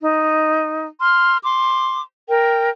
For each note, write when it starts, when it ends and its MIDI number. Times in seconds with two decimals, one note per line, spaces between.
0.01 0.87 63
1.00 1.37 84
1.00 1.37 89
1.44 2.00 84
1.44 2.00 86
2.29 2.70 70
2.29 2.70 79